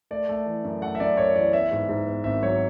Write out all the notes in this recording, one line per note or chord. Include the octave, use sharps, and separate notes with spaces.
A3 D5
A3
E3
F#2
A3 F#5
E5
F#2 D5
F#2 C#5
E3 D5
B3 E5
G#2
G#2
B3
G#1 E5
F#3 C#5